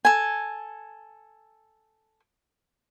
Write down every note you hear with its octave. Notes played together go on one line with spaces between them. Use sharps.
A4 G#5